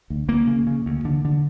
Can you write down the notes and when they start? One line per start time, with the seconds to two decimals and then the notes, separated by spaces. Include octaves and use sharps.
0.10 D2
0.29 D2 A#3
0.47 C#3
0.67 C#3
0.86 D2
1.05 D3
1.25 D3